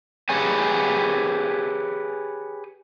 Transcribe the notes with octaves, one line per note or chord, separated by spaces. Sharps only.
G4 G#4 B4 C#5 G#5